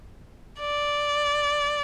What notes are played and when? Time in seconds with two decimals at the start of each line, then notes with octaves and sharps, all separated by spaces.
0.60 D5